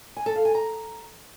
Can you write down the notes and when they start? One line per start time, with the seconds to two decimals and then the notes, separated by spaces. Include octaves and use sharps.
0.17 G#5
0.26 A4
0.36 F5
0.45 G#5
0.55 A#5